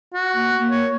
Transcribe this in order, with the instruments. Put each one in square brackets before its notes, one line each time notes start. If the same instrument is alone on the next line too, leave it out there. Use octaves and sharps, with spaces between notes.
[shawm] F#4
[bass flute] A#3
A#3
[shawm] C#5